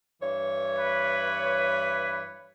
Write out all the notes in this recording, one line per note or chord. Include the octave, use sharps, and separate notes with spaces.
G2 E3 C#5
B4